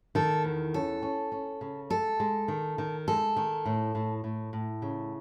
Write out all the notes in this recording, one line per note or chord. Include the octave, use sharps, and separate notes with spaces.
D#3 A4
E2
C#4 A4
C#4
C#4
C#3
G#3 A4
G#3
D#3
D#3
G#3 A4
D#3
A2
A2
A2
A2
C#3